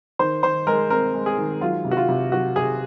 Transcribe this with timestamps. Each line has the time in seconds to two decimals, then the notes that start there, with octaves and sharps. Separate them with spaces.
0.19 D#3 C5
0.43 D#3 C5
0.67 G#3 A#4
0.90 C4 A#4
1.14 G#3
1.26 G#4
1.38 D#3
1.61 F#3 F4
1.85 C3
1.91 F#4
1.97 F4
2.09 C3
2.32 F#3 F#4
2.56 C3 G#4